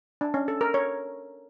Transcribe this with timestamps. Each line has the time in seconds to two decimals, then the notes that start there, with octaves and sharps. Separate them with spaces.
0.21 D4
0.34 C#4
0.48 A4
0.61 A#4
0.74 C#5